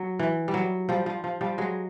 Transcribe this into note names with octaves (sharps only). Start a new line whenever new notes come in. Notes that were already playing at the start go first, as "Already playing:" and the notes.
Already playing: F#3
E3
G3
F#3
F3 G3
F3
F3
F3 G3
F#3 G#3